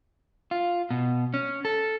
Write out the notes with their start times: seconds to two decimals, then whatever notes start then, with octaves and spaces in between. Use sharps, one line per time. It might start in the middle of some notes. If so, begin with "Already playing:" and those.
0.51 F4
0.90 B2
1.34 C#4
1.65 A4